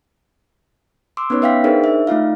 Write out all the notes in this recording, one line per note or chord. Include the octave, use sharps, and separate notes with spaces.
C6 D6 E6
B3 C#4 D#4 B4 C#5
B4 E5 F5 G5 B6
D4 D#4 G#4 A#4 C5 D5
E5
A3 D#4 F4 F5